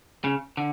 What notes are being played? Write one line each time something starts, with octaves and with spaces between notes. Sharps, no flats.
C#3
D3